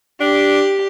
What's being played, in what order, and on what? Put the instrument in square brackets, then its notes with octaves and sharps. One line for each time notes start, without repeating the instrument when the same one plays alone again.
[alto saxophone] D4 [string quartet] G4